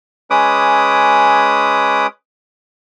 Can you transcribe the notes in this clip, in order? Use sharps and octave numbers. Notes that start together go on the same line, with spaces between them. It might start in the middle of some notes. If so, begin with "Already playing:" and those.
G#3 C#4 B4 D6 D#6